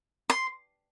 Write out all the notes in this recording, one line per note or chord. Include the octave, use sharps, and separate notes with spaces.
C6